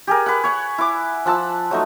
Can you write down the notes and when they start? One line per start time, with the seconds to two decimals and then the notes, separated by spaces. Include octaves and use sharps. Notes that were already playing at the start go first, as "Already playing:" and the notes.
0.07 G4 G#4 A#4
0.26 B4 F#5
0.44 C#5 F#5
0.78 E4 D6
1.26 F3 F#5 A5 E6
1.71 F#3 A3 D#4